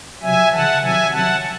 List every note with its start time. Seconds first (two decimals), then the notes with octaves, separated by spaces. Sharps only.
0.22 C3 F#3 E5 G#5
0.51 C#3 E3 F#5 A5
0.81 C3 D#3 F#3 E5 G#5
1.10 C3 D#3 F#3 F#5 A5